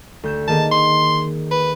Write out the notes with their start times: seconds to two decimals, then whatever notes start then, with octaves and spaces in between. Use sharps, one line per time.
0.23 D2 G6 E7
0.48 D#3 A#3 G#4 A5
0.71 C6
1.51 B4